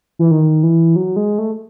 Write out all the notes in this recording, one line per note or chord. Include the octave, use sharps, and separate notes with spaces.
E3
D#3
E3
F#3
G#3
A3